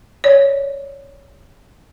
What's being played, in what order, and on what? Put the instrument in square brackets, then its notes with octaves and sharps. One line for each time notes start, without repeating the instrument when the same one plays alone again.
[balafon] C#5 D5